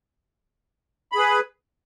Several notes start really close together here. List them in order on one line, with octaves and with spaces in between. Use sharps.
B5 G#4 B4